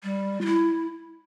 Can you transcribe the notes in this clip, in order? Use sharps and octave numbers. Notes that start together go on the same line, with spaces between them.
G3
F4
E4